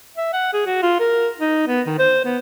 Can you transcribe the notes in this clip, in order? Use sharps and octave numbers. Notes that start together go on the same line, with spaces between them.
E5
F#5
G#4
F#4
F4
A#4
D#4
B3
D#3
C5
B3